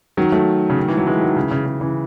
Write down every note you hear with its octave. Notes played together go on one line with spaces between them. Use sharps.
D#3 F#3
F#3 A3
C#3
D#3
E3
F#3
E3 G#3
D#3 F#3
C#3 E3
C#3
C#3
C#3 E3